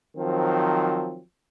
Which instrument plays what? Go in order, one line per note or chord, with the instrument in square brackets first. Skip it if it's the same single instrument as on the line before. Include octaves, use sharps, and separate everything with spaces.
[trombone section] D#3 F3 F#3 C4